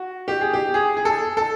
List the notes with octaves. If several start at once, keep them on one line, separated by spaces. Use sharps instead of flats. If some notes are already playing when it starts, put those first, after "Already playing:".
Already playing: F#4
G4
G#4
G4
G#4
G#4
A4
A4